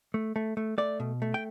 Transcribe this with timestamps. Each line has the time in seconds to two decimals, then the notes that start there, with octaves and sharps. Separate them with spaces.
0.14 A3
0.36 A3
0.57 A3
0.78 A3 D5
1.00 B2
1.22 A3
1.34 G5